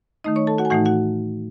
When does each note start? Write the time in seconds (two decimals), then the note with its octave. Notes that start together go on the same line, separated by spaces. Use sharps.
0.24 D#3 A3 D#4 D#5 D#6
0.36 C#5 C#6
0.47 A4 A5
0.58 F#4 F#5
0.65 G#5
0.70 A2 E3 A3 D#4 F#4 F#5
0.86 F#4 F#5